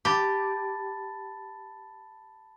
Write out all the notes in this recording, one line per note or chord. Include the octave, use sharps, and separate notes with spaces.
G4 A5 B5 A6